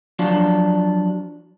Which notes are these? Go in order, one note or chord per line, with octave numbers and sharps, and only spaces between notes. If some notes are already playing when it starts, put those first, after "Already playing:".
F3 F#3 D4 F4